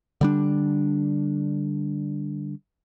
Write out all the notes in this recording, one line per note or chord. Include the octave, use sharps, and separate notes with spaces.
D3 G3 D4